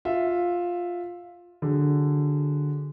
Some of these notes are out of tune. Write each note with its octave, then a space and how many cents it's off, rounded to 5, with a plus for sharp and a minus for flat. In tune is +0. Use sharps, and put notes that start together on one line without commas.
F4 +10 E5 +0
D3 +5 F#3 +0 G#4 +0